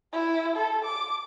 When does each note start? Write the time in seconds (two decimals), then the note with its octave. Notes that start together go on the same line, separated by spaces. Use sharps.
0.13 E4
0.56 A4
0.84 D6